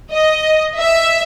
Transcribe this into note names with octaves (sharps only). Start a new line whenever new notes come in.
D#5
E5